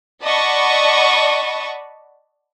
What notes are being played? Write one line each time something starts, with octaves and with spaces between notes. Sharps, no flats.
D5 D#5 F#5 A5 B5 C#6